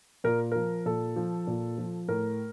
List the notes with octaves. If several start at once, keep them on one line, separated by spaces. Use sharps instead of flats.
A#2 A#4
F3 A#4
A#2 A4
F3
A#2
F3
A2 A#4